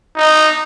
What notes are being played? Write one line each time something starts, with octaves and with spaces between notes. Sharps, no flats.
D#4